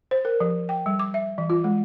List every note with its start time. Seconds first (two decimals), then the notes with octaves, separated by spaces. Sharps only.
0.11 C5
0.25 A#4
0.40 F3
0.69 G5
0.86 G3
0.99 D6
1.14 E5
1.38 E3
1.50 F4
1.64 G#3